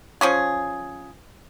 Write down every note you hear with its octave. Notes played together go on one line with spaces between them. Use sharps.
F3 C#4 G#4